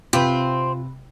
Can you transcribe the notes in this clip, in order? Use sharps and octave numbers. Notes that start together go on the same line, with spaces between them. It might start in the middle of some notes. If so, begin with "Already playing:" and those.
C3 C4 F4 G4 B4